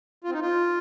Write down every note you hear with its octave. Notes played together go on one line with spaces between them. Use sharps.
F4
C4
D#4
F4